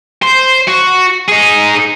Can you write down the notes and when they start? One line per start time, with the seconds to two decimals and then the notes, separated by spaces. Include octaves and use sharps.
0.23 C5
0.68 F#4
1.29 D#4 G#4